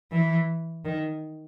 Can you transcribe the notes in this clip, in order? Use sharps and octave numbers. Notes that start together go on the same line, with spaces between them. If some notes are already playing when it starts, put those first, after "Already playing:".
E3
D#3